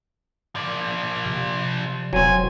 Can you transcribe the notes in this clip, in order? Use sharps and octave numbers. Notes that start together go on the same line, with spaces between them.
F3 D5
C3
E1 F#3 C4 G#5